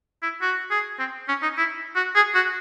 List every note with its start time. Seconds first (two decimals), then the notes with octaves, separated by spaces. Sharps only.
0.22 E4
0.42 F#4
0.70 G#4
0.99 C4
1.28 C#4
1.42 D#4
1.58 E4
1.96 F#4
2.15 G#4
2.35 F#4